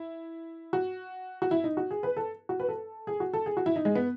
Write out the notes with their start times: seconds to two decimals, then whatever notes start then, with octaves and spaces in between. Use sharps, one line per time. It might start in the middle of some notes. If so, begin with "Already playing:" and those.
Already playing: E4
0.73 F#4
1.42 F#4
1.51 E4
1.64 D#4
1.77 F#4
1.91 G#4
2.03 B4
2.17 A4
2.49 F#4
2.60 B4
2.69 A4
3.07 G#4
3.20 F#4
3.33 A4
3.46 G#4
3.57 F#4
3.66 E4
3.76 D#4
3.85 G#3
3.95 B3